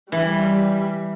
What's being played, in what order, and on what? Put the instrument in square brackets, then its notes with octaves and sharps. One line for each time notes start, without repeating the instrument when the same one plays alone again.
[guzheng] E3 [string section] G3